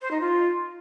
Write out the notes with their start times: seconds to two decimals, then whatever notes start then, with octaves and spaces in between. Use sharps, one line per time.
0.01 C5
0.11 D#4
0.20 F4